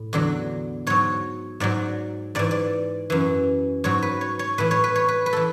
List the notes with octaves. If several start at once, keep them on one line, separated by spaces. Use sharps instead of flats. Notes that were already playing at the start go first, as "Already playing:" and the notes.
Already playing: A2
E2 D3 F#3
G#2 F#3 C#5
G#2 F#3 D5
G#2 E3 D5
D5
F#2 E3
G#2 F#3 C#5
B4
C#5
C#5
A2 E3 B4
C#5
B4
C#5
B4
B4
E3 A4